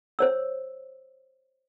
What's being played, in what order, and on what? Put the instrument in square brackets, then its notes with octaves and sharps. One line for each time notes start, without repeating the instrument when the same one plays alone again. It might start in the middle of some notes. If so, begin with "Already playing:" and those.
[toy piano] C5 C#5 E6